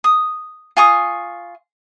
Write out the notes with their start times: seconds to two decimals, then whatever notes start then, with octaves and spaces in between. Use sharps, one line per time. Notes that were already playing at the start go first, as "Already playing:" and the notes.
0.04 D#6
0.77 F4 G#5 C#6 D#6